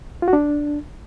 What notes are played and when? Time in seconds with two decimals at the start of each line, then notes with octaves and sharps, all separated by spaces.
0.22 F4
0.28 F#4
0.33 D4